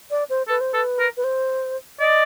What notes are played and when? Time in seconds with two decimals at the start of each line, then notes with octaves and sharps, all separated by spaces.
0.11 D5
0.30 C5
0.48 A4 B4
0.61 C5
0.73 A4 B4
1.00 A#4
1.17 B4
1.24 C5
2.00 D5 D#5